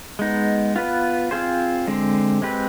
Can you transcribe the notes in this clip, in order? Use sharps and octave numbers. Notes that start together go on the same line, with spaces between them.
G#3 B3 D#4
B3 F4 B4
C4 F4 G#4 C5
D3 G#3 C4
G#3 C4 G4 B4